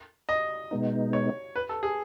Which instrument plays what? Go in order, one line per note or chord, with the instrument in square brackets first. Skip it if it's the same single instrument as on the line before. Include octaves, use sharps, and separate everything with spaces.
[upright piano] D#5
[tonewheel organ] B2 G#3 B3 D#4
[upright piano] C#5
B4
A4
G#4